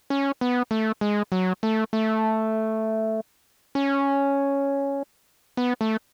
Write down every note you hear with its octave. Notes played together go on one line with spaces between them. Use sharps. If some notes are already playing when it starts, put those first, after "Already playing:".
C#4
B3
A3
G#3
F#3
A3
A3
C#4
B3
A3